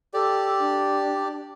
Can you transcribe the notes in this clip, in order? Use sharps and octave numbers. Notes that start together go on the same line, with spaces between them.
G4 A4 D5
D4